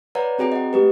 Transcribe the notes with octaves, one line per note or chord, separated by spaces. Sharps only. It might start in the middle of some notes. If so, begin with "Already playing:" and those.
B4 C#5 D5 F#5 A#5
C4 F#4 G#4 G5 A#5
D#5 F#5
A3 G4 B4